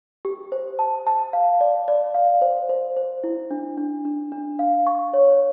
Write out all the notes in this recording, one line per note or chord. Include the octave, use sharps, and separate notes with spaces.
G4
C5
A5
A5
F5
D5
D5
F5
C5
C5
C5
E4
D4
D4
D4
D4
F5
C#6
C#5